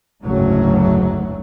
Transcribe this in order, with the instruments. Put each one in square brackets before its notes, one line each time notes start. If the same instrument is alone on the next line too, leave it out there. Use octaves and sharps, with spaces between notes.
[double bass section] F#1 D2 G#2 F#3 A3